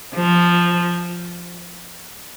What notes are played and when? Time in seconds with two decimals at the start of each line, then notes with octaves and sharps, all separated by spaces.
0.14 F3